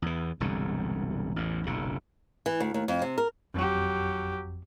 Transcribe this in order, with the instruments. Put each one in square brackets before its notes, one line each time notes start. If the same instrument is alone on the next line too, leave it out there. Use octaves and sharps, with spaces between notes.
[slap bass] E2 E3
E1 C2 G2 D3
A1 E2 A2
F#1 B1 A#2 C#3
[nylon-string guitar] E3
D2
D#2
F2
C3
A#4
[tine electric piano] G#1 F2 [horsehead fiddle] F#3 G4